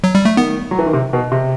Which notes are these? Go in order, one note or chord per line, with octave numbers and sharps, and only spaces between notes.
F#3
G3
A3
D#3 B3
F#3
E3
D#3
C3
B2
C3